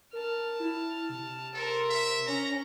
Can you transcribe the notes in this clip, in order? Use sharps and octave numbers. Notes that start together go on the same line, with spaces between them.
A#4 A5 F6
E4
C3
A4 A#4 C5
E5
C#4 A#5